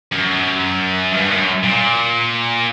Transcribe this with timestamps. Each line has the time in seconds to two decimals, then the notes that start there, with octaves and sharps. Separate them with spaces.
0.12 F#2
1.13 G2
1.30 F#2
1.63 A#2